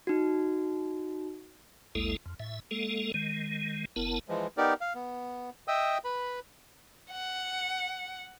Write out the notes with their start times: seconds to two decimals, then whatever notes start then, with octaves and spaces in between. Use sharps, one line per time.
0.07 D#4 F#4
1.95 A1 D#2 G#3 A#3 E4 A4
2.26 F2
2.40 A2 E5
2.71 G#3 A#3 A4
3.14 D#3 G#3
3.96 F#1 B3 E4 A#4 A5
4.29 E3 F3 G#3
4.57 B3 D#4 G4 A#4 D5
4.81 F5
4.95 B3
5.68 D#5 E5 G5 D#6 E6
6.04 B4 B5
7.11 F#5